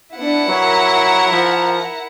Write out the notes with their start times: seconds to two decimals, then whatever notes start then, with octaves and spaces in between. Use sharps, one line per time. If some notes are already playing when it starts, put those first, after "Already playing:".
0.16 B3 D4 E4 F#5
0.49 F#3 A#4 E5 A#5
1.32 F3